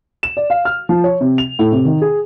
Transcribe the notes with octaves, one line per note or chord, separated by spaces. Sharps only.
E7
D5
F5
F6
F3
C#5
C3
F7
A2
C3
D#3
G#4